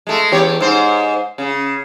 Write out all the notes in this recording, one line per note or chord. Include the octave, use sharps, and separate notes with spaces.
G#3 A3
E2 G4 C#5
G#2 C5
C#3